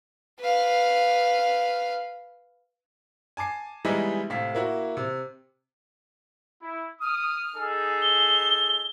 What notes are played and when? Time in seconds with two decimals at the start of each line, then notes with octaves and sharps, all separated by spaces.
0.40 B4 F5
3.37 G#5 A5 D6 C7
3.85 E3 G3 G#3 B3 D#4 E4
4.30 A2 C3 F5 B6
4.55 A#3 E4 F#4
4.97 C3
6.62 E4
7.01 D#6 F6
7.56 D#4 G#4 A4
8.02 G7